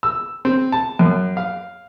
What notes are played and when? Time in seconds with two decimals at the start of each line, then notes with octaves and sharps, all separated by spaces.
0.03 E6
0.45 C4
0.72 A5
0.99 F#2
1.37 F5